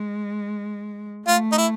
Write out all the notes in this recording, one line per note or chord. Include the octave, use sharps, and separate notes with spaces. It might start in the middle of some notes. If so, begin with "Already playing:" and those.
Already playing: G#3
A3 F4
D#4
E4